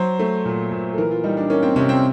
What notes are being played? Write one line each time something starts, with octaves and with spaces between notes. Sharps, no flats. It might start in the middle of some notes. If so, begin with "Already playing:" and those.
Already playing: F#3 C5
A3
A#2
A#2
A4
E3 A#4
F4
G3 D#4
D4
A#3 C#4
C4
C3 C#4
C4